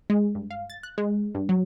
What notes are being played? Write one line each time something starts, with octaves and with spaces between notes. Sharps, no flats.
G#3
G2
F5
A6
F#6
G#3
G2
F#3